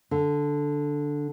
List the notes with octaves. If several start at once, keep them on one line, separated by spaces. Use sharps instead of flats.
D3